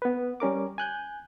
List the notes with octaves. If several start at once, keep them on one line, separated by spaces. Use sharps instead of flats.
B3 B4
G3 C#4 A#4 D6
G#5 F#6 G6